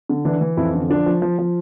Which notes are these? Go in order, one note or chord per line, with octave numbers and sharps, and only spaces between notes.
D3
E3 D4
E3
F2 E4
D3
F3 D4
F3
F3
F3